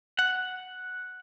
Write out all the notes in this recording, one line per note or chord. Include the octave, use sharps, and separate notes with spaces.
F#5